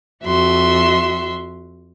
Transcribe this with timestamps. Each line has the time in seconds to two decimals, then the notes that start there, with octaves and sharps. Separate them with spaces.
0.24 F2 F#4 E5 C6